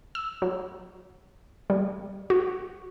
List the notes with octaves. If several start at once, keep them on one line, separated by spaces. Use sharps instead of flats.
E6
F#3
G3
F#4